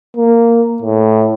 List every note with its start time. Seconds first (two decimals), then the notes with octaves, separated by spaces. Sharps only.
0.17 A#3
0.82 A2